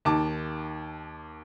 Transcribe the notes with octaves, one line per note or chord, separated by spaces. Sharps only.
D#2 A5 D6